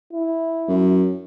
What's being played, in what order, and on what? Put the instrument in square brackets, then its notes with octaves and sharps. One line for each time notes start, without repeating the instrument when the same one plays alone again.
[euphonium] E4
[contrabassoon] F#2